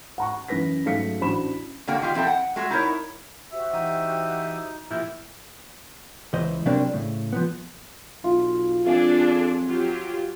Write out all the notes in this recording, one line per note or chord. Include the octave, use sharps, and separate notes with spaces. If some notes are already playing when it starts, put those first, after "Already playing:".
F#5 A#5 C#6
F#2 E3 C#4 B4 A#6 B6
G#2 F#3 A3 F5 B6 C#7
A1 D4 F#4 C5 B5 E7
D3 A#3 F#4 G5
D#3 F4 G4
F3 C4 E4 F4 A4 G5
F#5
G#3 A3 F#4
D#4 E4 A#4 C#5
F#4 G4 C5 E5
E3 D#4 D#6
A#2 F3 E4 G4
C#2 E3 C5 D#5
C3 F#3 G3 A#3 C4 D4
A2 C#3
F3 B3
B1 F4
F2 D4 G#4 A4 F5 G#5
F#3 F4 G4